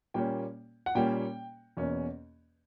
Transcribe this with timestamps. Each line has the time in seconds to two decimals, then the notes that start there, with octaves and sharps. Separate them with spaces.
0.14 A#2 G3 A#3 C#4 G5
0.86 F#5
0.95 A#2 G3 A#3 C#4 G5
1.77 E2 B2 A#3 C#4